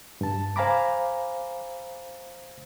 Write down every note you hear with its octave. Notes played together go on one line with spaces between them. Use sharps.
G2 A5
C5 F5 G#5 A#5 B5 D6